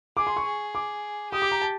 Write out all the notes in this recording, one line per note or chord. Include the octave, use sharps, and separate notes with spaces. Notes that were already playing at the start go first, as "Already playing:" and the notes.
G#4 D6
C6
C#6
G#4
D6
G4 D#6
D6
A#5
A5